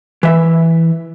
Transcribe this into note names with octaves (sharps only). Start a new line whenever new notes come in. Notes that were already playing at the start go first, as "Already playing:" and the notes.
E3 E5